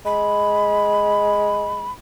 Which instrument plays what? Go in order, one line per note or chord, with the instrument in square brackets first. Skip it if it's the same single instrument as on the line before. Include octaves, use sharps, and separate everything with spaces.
[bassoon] G#3 [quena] B5